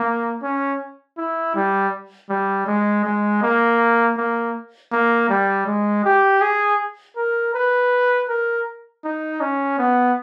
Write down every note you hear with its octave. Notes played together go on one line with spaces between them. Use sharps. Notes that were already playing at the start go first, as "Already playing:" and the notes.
Already playing: A#3
C#4
E4
G3
G3
G#3
G#3
A#3
A#3
A#3
G3
G#3
G4
G#4
A#4
B4
A#4
D#4
C#4
B3